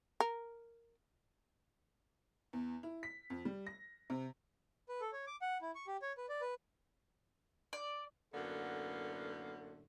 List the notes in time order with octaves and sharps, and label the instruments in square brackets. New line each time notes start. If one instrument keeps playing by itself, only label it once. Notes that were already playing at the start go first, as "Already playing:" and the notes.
[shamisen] A#4
[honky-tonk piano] E2
E4
B6
F2
G3
A#6
C3
[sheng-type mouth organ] B4
A4
C#5
D6
F#5
E4
C#6
G4
C#5
B4
D5
B4
[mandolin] D5
[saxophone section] F#2 A2 D3 A#3 B3